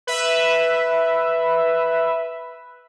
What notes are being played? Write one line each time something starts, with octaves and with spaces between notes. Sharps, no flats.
B4 E5